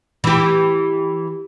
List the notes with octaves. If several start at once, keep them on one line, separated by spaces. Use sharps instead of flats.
E3 G4